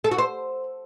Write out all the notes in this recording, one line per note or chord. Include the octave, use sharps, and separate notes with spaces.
A4
F#4
C5